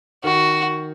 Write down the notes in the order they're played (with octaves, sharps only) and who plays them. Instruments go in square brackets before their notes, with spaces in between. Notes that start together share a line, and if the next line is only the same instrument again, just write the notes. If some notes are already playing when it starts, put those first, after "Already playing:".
[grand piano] D#3 [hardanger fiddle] F#4